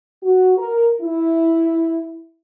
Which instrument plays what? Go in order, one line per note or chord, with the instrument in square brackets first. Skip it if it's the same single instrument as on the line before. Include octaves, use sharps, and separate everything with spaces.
[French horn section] F#4
A#4
E4